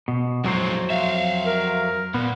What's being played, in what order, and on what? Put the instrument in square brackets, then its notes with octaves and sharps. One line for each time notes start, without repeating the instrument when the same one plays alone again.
[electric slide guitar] B2
[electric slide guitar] F2 F#3 C5 [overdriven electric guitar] A#2 G#3
[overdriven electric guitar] E5 F5
[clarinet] A#4
[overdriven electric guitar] A#2 [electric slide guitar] B3